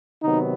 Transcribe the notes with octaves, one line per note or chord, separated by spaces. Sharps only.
C3 D#3 F#3 B3 D#4